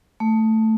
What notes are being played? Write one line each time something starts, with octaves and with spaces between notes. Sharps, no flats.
A3